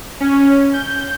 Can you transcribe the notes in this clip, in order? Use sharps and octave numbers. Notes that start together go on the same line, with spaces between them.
C#4
G6